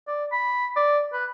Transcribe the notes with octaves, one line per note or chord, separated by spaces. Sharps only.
D5
B5
D5
B4